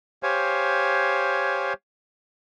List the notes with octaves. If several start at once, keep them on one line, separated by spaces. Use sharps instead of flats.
G4 C5 C#5 F5 G#5